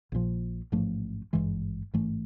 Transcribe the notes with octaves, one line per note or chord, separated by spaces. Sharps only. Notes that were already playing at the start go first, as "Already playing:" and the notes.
A#1 A#2 F3
A1 G#2 F3 A3
G#1 G2 E3 G#3
A1 G#2 E3 A3